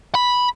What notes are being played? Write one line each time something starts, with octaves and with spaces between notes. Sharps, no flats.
B5